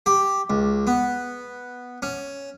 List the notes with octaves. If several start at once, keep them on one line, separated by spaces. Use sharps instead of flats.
G4
C#2
B3
C#4